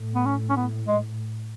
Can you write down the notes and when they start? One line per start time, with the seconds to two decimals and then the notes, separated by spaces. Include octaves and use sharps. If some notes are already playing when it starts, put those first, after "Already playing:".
Already playing: A2
0.15 B3
0.26 C#4
0.50 C#4
0.56 B3
0.88 G#3